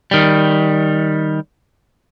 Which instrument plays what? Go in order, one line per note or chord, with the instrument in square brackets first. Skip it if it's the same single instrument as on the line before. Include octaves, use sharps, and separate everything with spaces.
[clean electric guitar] D#3 G3